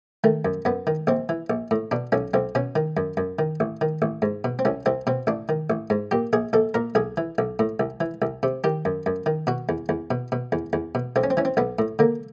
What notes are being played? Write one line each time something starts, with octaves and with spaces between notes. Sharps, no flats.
D#3 A3
F#2
F#2 B3
D#3
A#1 C4
E3
A#1
A2
B2 D4
B1 C#4
B1 C4
B2 C#4
D#3
F#2
F#2
D#3
A1
D#3
A1
G#2
B2
C4
C2 C#4
C2 C4
B2 C4
A1 D4
D#3
A1
G#2
A#2 G4
A#1 G#4
A#1 A4
A#2 A#4
B1 G#4
E3
B1
A2
C2
E3
C2
C3
D#3 G4
F#2
F#2
D#3
B2 F#4
E2
E2
B2
B2
E2
E2
B2
B1 C4
C#4
C4
E3 C#4
C4
B1 B3
A2
D3 A#3